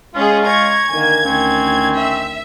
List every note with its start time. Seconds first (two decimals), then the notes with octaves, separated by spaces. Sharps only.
0.15 G#3 C#4 F4 G#4
0.45 A#5 C#6 G#6
0.89 D3 D#3 A#3 G#5
1.25 D2 D#3 C4 C#4
1.96 E5